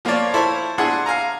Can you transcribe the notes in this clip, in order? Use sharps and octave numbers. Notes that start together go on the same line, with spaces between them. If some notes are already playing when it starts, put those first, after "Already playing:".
F3 A#3 F4 C#5 D5
E4 A4 C5 C#5
D4 E4 G#4 F#5 C6
F5 G#5 A#5